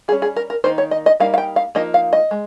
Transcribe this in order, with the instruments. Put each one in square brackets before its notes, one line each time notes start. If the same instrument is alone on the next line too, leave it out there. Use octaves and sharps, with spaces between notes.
[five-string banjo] G3 G#4
C#4
G#4
A#4
A#4
D#3 A#3 D#4 C5
C#5
D#5
D#5
G3 A#3 D#4 F5
F5
G5
F5
F3 A#3 D#4 D#5
F5
D#5
G#3